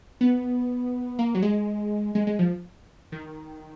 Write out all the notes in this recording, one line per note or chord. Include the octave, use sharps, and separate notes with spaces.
B3
A#3
F#3
G#3
G#3
G#3
F3
D#3